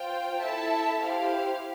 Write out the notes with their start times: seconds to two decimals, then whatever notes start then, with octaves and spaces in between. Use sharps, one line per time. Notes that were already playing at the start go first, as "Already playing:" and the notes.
Already playing: F4 C5 G5
0.42 E4 A4 E5 A5
1.01 E4 G4 C5 F5